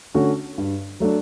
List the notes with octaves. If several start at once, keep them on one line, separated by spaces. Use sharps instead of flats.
D3 A3 C#4 F#4
G2
F#3 A3 D4